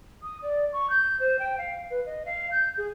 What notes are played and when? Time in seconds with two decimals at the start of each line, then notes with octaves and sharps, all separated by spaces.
0.22 D#6
0.42 D5
0.73 C#6
0.90 G6
1.20 C5
1.39 G5
1.58 F5
1.90 B4
2.06 D#5
2.25 F5
2.51 G6
2.77 G#4